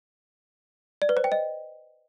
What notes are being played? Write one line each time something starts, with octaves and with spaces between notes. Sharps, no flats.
D5
B4
C5
G5
D#5